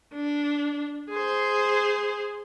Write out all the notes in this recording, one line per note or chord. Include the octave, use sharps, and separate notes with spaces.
D4
G#4 C5